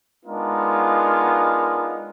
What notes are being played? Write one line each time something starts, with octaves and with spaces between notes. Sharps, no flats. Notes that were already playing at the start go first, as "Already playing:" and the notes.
G#3 B3 D4 D#4 F4 A#4